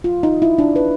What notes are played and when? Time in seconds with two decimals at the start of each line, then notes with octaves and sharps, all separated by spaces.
0.04 F4
0.23 D#4
0.42 E4
0.58 D4
0.76 B4